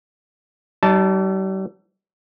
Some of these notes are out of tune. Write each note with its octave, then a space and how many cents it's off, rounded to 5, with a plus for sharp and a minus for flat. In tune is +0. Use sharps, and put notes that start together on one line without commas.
G3 -45 D#4 +10 A5 +0